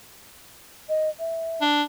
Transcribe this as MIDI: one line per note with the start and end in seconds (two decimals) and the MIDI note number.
0.89 1.09 75
1.19 1.62 76
1.61 1.82 62